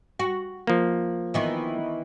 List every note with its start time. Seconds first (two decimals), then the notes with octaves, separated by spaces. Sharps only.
0.19 F#4
0.67 F3 A#3
1.34 D#3 E3 B3